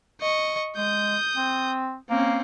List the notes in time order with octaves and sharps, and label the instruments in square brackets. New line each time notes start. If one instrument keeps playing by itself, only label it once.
[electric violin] D#5 C#6
[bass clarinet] G#3 [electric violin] D#6 G6
[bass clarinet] C4
[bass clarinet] A#3 [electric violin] C4 C#4